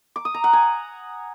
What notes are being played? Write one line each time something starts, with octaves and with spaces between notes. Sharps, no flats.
D6
D#6
A#5
F#5
G#5